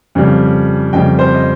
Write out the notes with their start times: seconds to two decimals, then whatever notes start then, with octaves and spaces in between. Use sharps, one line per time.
0.15 F2 C#3 G3
0.93 F2 C#3 G3 D#5 G5
1.19 C5
1.34 D#5